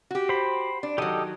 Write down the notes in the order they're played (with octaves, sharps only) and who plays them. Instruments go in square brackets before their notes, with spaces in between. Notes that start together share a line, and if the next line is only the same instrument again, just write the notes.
[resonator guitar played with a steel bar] F#4 G4
[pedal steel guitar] C5 B5
[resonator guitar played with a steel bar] D4
[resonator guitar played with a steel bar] D#3 F#3 [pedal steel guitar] G4 A4 D#5